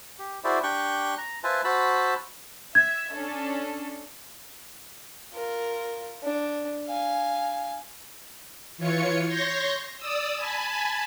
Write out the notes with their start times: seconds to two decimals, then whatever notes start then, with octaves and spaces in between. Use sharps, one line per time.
0.19 G4
0.44 E4 F#4 G#4 C5 D5 E5
0.63 D4 G4 G5 C#6 F#6
1.18 A#5
1.44 F4 B4 C5 E5 G#5 A5
1.64 F#4 C5 A5 B5 E6
2.75 E5 G#6
3.13 C#4 D4 A4
5.33 F4 A#4
6.23 D4
6.87 F5 G#5
8.78 E3 F4 C#5 C#7
9.26 C#5 C6 C#6 G6 A#6
9.97 D5 D#6 E6
10.37 G#5 A5 B5